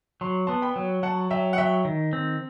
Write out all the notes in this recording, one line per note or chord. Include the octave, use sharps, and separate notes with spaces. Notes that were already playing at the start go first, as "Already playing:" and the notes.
F#3 C6
B3 A5 C6
G5 B5
F#3
F#3 F#5 A5
F#3 E5 G5
F#5
F#3 E5 G5
D#3
C4